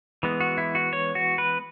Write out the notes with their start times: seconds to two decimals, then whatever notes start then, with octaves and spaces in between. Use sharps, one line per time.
0.23 E3 G#3 B3
0.40 F#4
0.58 E4
0.75 F#4
0.93 C#5
1.15 F#4
1.38 B4